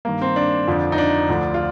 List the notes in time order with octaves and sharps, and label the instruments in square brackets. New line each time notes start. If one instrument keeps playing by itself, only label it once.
[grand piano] G2 D#3 A#3
C4
D4
F2 D3 F3
D#4
D4
D2 D3 F3
F4